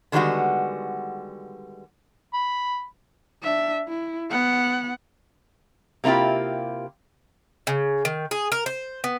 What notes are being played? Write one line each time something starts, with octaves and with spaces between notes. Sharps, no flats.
D3 D#3 G3 G#3 B3 F#4
B5
D4 E5
E4
B3 F#5
C3 A#3 E4 F4 G4
C#3
D#3
G#4
A#4
C5
B3